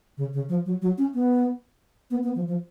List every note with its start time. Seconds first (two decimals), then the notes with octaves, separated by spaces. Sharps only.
0.17 C#3
0.33 C#3
0.49 F3
0.66 F#3
0.82 F#3
0.98 C#4
1.14 B3
2.11 B3
2.23 B3
2.35 F3
2.48 F3